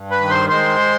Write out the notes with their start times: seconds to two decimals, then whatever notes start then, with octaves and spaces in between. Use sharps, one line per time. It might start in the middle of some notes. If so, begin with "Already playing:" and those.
Already playing: G2
0.11 B4 B5
0.20 D#3
0.30 C5 C6
0.50 G#3 C5 C6